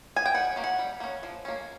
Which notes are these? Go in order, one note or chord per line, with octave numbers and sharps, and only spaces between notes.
G#5
G5
G3 F#5
A#3 C#4
F#5
G3
A#3 C#4
F3
A#3 C#4